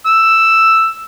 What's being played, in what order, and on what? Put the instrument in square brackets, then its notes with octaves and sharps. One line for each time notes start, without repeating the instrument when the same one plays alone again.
[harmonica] E6